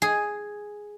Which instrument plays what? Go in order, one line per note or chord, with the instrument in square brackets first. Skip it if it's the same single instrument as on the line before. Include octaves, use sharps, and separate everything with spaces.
[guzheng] G#4